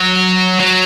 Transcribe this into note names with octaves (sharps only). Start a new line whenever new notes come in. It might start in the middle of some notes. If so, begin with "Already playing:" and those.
Already playing: F#3
F#3